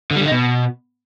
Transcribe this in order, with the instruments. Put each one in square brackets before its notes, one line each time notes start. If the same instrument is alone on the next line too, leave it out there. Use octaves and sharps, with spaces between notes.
[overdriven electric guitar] D3
G3
D3
D#4
B2